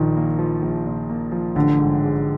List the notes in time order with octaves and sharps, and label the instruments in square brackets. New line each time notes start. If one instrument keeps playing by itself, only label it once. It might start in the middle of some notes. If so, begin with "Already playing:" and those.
Already playing: [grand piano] A#1 A#2 [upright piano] D#3
[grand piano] A#3
F3
A#1
A#2
A#3
F3
[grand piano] A1 [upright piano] D3
[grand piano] G#2
G#3